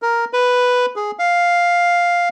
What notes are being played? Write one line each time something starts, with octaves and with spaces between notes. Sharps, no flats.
A#4
B4
G#4
F5